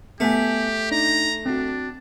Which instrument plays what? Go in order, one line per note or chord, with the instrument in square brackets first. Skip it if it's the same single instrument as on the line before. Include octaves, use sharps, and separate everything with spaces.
[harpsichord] A3 [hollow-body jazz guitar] B3 F#5 G#5 [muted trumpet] G4
[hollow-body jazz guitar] D4 D#4 [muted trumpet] A#5
[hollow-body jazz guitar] C4 F#4 [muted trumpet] D4